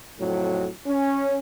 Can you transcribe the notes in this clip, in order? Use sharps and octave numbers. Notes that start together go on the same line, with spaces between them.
F2 A2 F#3
C#4